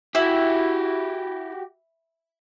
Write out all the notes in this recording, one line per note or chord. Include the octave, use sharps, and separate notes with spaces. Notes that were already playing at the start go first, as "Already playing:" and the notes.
E4 F#4 G4